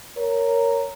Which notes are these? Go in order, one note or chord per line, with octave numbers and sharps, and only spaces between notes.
A#4 C#5